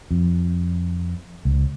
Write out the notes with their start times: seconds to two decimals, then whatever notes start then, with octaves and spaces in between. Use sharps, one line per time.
0.11 F2
1.45 C#2